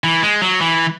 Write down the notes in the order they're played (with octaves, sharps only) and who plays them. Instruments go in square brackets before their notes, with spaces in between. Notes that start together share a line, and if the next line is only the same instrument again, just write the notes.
[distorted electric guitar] E3
G#3
F#3
E3